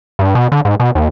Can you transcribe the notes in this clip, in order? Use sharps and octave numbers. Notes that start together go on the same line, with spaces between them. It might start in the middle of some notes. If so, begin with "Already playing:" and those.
G2
B2
D3
G#2
B2
D#2